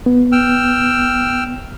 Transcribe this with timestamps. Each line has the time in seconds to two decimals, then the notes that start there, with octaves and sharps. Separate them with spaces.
0.06 B3
0.32 G5 E6 F6